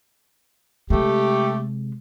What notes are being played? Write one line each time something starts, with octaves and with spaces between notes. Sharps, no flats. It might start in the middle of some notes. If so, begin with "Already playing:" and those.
C3 G#3 A3 G4